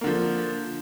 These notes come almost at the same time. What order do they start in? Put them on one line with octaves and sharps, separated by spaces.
A#3 D3 F3